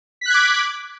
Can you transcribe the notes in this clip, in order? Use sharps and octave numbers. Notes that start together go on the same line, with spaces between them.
D6 F#6 G#6 B6